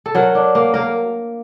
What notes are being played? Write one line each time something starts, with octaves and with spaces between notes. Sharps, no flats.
A4
F#3 A#4
D4
A#3
A#3 A#4